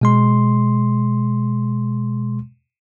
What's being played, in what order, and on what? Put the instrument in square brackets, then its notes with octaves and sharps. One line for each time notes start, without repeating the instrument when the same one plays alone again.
[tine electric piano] B2 G#3 C6